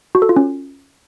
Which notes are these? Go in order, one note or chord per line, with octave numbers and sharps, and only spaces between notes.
F#4
A4
F4
C#4